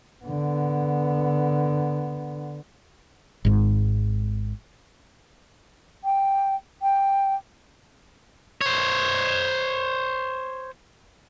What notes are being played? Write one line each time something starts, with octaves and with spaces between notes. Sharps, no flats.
D3 B3
G#1 G#2
G5
G5
C5 C#5